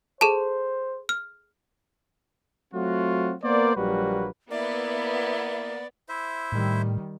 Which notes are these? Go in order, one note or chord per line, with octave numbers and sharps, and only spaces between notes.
G#4 A4 C5 A5
F6
F#3 A3 C4 F4 F#4
A#3 B3 A#4 C5 D5
A#1 F#3 G3 A#3 F#4 B4
A#3 B3 E4 D5 E5
E4 C5 E5
A2 D#3 G3